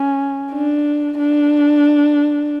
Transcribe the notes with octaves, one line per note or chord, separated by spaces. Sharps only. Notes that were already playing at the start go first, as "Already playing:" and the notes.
Already playing: C#4
D4
D4